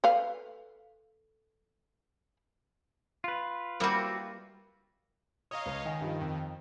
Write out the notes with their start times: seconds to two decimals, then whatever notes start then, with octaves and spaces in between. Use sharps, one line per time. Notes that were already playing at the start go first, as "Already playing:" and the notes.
0.04 A4 B4 F5
3.24 F4 B4
3.80 G3 A#3 C4 E4 F#4
5.51 C#5 D#5 F5 A#5 D#6
5.66 C#2
5.86 D#3 D#5 F#5 G#5
6.01 G2 F3
6.21 F2